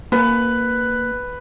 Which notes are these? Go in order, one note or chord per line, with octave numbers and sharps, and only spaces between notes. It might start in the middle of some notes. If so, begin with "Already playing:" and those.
A#3 B4